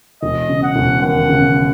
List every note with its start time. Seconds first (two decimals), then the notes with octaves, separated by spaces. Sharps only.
0.22 E1 D#5
0.49 C#3
0.63 F#5
0.76 E1
1.02 D#2 F#5
1.29 C#3